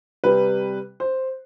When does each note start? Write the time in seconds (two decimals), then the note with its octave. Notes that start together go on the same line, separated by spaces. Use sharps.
0.24 C3 G3 B4
1.00 C5